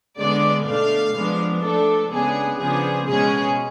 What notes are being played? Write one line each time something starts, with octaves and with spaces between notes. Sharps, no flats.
D3 G#3 B3 D4 D5
B2 A3 D4 F5
F3 G#3 B3 D4
F3 A3 D4 A4
C#3 G#3 B3 D4 G#4
C#3 F3 B3 D4 G#4
B2 G#3 C#4 G#4